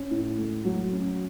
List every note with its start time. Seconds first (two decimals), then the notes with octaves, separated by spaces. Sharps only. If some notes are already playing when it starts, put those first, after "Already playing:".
Already playing: C#4
0.11 A2
0.38 A3
0.64 F#3
0.92 C#4